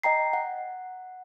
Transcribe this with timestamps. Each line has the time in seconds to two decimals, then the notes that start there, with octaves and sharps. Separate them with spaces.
0.03 D#5 G5 A#5 C7
0.33 F#5